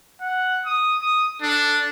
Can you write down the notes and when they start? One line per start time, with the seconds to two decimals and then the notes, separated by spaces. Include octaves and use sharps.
0.21 F#5
0.66 D#6
1.02 D#6
1.42 D4 A4